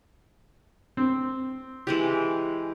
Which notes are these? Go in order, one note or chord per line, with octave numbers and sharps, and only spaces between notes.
C4
E3 G#3 G4